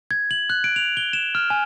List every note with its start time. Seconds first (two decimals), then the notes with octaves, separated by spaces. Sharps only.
0.11 G#6
0.31 F#7
0.50 F#6
0.64 D7
0.76 F7
0.97 G7
1.13 E7
1.35 F6
1.50 G#5